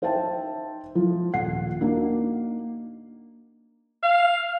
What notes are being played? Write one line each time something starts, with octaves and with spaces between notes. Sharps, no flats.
D#4 C5 E5 G5 A5
F3
D#1 F#5 C7
A#3 D4 D#4 F#4
F5